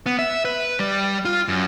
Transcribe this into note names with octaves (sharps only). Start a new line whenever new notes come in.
B3
E5
B4
G3
F4
F#2